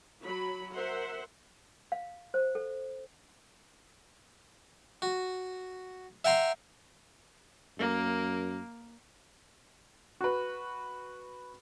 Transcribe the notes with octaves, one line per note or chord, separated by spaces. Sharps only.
F#3 B5
A#4 C5 E5 F#5
F5
C5
A4
F#4
E5 F#5 G5 A#5 C6
F#2 A#3
F#4 B4